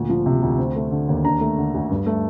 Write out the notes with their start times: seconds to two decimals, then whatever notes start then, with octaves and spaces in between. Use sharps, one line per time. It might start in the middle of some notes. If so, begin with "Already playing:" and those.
Already playing: D2 A#2
0.09 F3
0.26 C3
0.42 D2
0.58 C4
0.76 A3
0.91 D3
1.09 D#2
1.25 D4 A#5
1.41 A3
1.58 D3
1.74 D2
1.90 G2
2.06 A3